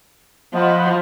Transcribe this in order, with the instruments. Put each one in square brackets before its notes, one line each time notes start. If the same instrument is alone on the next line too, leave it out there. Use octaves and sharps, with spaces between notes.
[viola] F3 [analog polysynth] D#5 F#5 B5